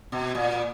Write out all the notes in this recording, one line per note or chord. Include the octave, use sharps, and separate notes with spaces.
B2
A#2